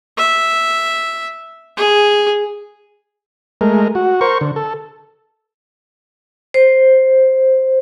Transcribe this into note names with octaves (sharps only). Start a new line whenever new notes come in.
E5
G#4
G#3 A3 A#4
F#4
A#4 C5 C#6
D3
A4
C5